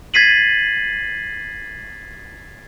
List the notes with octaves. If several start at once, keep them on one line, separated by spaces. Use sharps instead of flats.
G#6 A6 B6 C7 D#7 F#7